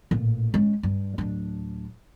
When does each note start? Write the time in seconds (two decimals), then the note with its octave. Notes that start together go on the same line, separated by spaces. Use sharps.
0.11 A1 A#2
0.54 G#3 C#4
0.83 G2
1.18 D1 D4